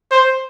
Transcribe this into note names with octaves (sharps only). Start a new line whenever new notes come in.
C5